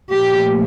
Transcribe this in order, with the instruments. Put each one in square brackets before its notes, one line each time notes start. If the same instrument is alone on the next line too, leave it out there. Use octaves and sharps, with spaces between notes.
[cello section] A#2 F3 A3 G4